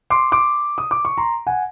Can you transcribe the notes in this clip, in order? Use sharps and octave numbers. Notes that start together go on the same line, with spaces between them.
C6 D6
C6 D6
D#6
D6
C#6
A#5 C6
F#5 G#5